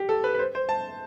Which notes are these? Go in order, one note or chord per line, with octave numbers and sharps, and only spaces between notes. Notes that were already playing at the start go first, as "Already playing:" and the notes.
Already playing: G4
A4
B4
B4
C5
C5
A5